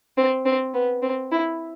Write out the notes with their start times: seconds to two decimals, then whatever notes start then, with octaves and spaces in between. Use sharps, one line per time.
0.17 C4
0.46 C4
0.74 B3
1.02 C4
1.32 E4